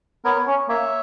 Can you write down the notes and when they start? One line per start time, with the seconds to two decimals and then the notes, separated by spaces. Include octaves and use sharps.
0.24 B3 A#4 C#5
0.47 C#4
0.69 A#3 C#5 E5